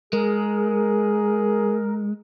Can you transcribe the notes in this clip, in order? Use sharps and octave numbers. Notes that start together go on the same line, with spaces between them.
G#3 G#4 A#4